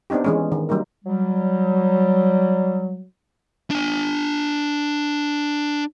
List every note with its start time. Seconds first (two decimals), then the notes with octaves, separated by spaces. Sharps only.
0.10 B3 C4 D4 D#4 G4
0.24 E3 G#3 C#4
0.52 D#3
0.69 F#3 G3 A#3 D#4 A#4
1.05 F#3 G3
3.71 D4 G#5